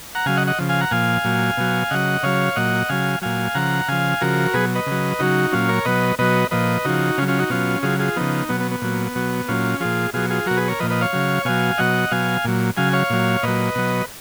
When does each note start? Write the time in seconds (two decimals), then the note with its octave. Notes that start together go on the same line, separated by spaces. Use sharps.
0.15 F#5 A#5
0.26 C#3 F#3 F5 G#5
0.37 D#5 F#5
0.47 D#5 F#5
0.59 C#3 F3
0.69 F5 G#5
0.81 F#5 A#5
0.91 A#2 F3 F5 G#5
1.24 A#2 F#3
1.57 B2 F#3
1.90 C#3 F#3 D#5 F#5
2.23 C#3 F#3 C#5 F5
2.56 A#2 F#3 D#5 F#5
2.89 C#3 F#3 F5 G#5
3.22 A#2 F#3 F5 G#5
3.55 C#3 F3 F#5 A#5
3.88 C#3 F3 F5 G#5
4.21 C#3 F3 F#4 A#4
4.54 B2 F#3 G#4 B4
4.75 B4 D#5
4.86 C#3
4.91 F#3
5.19 C#3 F#3 D#4 F#4
5.52 A#2 F#3 C#4 F4
5.69 A#4 C#5
5.85 B2 F#3 B4 D#5
6.19 B2 F#3 B4 D#5
6.51 A#2 F3 B4 D#5
6.85 C#3 F3 D#4 F#4
7.18 C#3 C#4 F4
7.22 F#3
7.28 C#4 F4
7.39 D#4 F#4
7.50 B2 F#3 C#4 F4
7.83 C#3 F#3 F4 G#4
7.99 F4 G#4
8.16 C#3 F3 B3 D#4
8.48 B2 F#3 B3
8.60 B3
8.71 B3
8.82 A#2 F#3
9.16 B2 F#3
9.48 A#2 F#3 C#4 F4
9.80 A#2 F3 F4 G#4
10.13 B2 F#3 F4 G#4
10.30 F4 G#4
10.46 B2 F#3 F#4 A#4
10.57 G#4 B4
10.68 A#4 C#5
10.79 A#2 F3 B4 D#5
10.90 B4 D#5
11.01 C#5 F5
11.13 C#3 F#3
11.45 B2 F#3 F5 G#5
11.78 B2 F#3 D#5 F#5
12.11 B2 F#3 F5 G#5
12.44 A#2 F#3
12.77 C#3 F#3 F5 G#5
12.93 C#5 F5
13.10 A#2 F#3
13.43 A#2 F#3 B4 D#5
13.75 B2 F#3